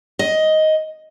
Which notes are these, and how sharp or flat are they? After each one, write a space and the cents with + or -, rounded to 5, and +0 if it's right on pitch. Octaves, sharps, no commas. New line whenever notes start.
D#5 +10